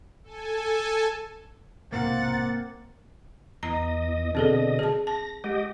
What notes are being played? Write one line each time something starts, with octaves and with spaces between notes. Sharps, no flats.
A4 G#5
B1 G#2 C3 A#3 C4 F#5 A6
E2 D#5 A#5
B2 D3 C4 G#4 A4 D#5
G#4 A5
A5 A#6
G#3 G4 D#5